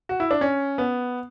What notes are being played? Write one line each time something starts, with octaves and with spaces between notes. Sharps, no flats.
F#4
E4
D4
C#4
B3